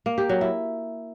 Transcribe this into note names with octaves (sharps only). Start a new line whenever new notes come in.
A#3
G4
F#3
E4